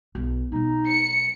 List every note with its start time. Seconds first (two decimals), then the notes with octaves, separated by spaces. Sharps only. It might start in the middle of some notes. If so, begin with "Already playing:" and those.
0.15 B1
0.52 B2 F#3 D#4
0.88 C#7